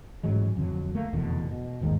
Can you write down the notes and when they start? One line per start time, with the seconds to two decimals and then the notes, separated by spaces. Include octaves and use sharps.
0.24 A1 G#2 F#3 G#3
0.57 F2 D3 F#3
0.95 A3 A#3
1.13 F1 E2 B2 D3
1.51 B2
1.81 G1 D#2 G#2 D#3